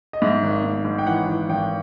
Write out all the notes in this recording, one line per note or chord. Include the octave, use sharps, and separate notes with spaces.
D#5
G#2 E5
G#1
G#2
G#2
G5
E3 F#5
E3
G#1 G5